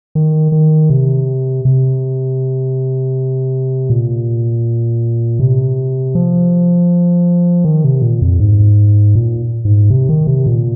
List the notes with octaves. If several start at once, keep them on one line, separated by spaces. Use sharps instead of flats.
D#3
D#3
C3
C3
A#2
C3
F3
D#3
C3
A#2
F2
G#2
A#2
G#2
C3
D#3
C3
A#2